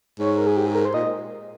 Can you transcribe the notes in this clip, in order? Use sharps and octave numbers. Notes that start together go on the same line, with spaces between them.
G#2 C#5
A#4
G#4
G4
G#4
A#4
C5
A#2 D#5